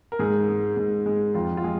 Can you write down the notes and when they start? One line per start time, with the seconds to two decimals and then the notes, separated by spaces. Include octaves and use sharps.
0.12 A#4
0.19 G#2 G#4
0.49 G#3
0.77 G#2
1.06 G#3
1.34 F2 F4
1.57 F4
1.64 G#3 G#4